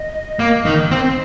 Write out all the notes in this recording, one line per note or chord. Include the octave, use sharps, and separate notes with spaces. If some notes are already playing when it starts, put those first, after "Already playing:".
Already playing: D#5
A#3
D#3
C4